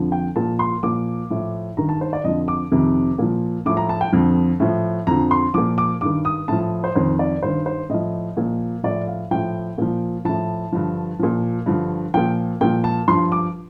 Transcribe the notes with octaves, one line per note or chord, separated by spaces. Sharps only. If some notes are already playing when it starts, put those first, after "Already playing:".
Already playing: F2 D3 F3
G5
A#2 F3 A5
C6
A#2 F3 D6
A2 F3
G2 D#3 A#5
A5
C5
D5
F2 D3 F3 D#5
D6
F2 C3 D#3
A#2 F3
A2 F3 D6
A#5
A5
G5
F2 D3 F3
A2 F3
F2 D3 F3 A#5
C6
A#2 F3 D6
D6
G2 D#3 D6
D#6
A2 F3 A5
C5
F2 D#3 C5
D5
G2 D#3 C5
C5
A2 F3 D#5
A#2 F3
A2 F3 D5
F5
A2 F3 G5
A#2 F3
A2 F3 A5
G2 D3 F3
A#2 F3
G2 D3 F3
A#2 F3 G5
A#2 F3 G5
A5
G2 F3 C6
D6